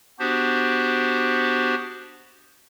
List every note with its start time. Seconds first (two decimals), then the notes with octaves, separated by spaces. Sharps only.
0.19 B3 D4 F#4 G4 C5